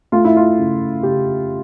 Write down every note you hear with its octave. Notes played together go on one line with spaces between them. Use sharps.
A3 F4
E4
F4
C#3
C#3 G4